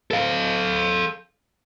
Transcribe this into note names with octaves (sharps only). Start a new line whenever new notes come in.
A4 F5